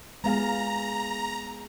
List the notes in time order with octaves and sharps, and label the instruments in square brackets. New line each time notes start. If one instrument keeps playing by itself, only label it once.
[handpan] G#3 F5 [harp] B3 G#4 [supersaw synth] A#5